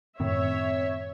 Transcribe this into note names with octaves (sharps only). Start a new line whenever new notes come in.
F#2 A2 D#3 C4 C#5 E5